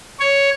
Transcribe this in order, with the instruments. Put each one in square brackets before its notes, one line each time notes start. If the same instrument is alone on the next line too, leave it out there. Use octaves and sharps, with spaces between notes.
[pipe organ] C#5